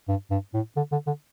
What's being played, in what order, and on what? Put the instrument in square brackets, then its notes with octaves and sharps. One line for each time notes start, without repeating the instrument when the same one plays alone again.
[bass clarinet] G2
G2
A2
D3
D3
D3